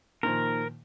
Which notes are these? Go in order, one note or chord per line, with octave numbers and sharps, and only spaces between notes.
A#2 D#3 F3 A#4